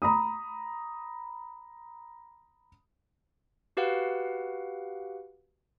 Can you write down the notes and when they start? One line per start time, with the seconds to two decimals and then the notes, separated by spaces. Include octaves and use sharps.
0.02 A#5 B5 D#6
3.77 F#4 G4 B4 F5 F#5